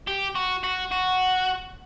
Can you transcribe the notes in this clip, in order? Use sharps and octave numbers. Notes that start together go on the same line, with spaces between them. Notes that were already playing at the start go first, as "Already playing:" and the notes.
G4
F#4
F#4
F#4